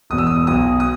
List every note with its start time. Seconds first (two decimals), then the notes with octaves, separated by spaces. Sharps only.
0.10 E1 E2 B2 D#6
0.18 E6
0.27 D#6
0.47 B1 B2 D#6
0.80 D#6